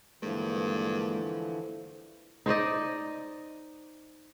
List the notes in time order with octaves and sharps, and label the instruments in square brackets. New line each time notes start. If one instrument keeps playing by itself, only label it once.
[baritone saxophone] G2 [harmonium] D3 E3 F3 [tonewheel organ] G#3 A#3
[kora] D#4 C5 D5 D#5